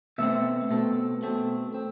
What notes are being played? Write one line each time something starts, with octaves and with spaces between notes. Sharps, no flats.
B2 A3 C4 E5
B2 A3 C4
B2 A3 C4
C4